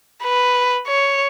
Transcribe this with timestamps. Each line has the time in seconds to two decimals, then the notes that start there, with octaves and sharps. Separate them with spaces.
0.22 B4
0.87 C#5